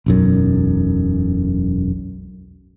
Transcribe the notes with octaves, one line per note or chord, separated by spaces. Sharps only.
E1 B1 F#2